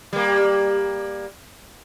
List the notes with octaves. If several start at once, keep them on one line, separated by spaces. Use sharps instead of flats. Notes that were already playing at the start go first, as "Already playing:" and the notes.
G3 A#3